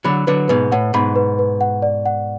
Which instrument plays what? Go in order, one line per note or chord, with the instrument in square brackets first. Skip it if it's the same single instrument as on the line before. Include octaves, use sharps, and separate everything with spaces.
[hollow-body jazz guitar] D3 F#3 [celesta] B5
[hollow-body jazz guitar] D3 F#3 [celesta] B4
[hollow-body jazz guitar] G#2 B2 [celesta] B4
[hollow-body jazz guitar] A2 [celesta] F#5
[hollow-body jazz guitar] G#2 B2 [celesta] B5
[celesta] B4
B4
F#5
D5
F#5